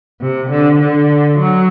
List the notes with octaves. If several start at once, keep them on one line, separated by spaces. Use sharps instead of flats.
C3
D3
D3
F#3